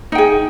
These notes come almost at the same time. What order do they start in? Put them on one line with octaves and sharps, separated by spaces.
D#4 G5 G#4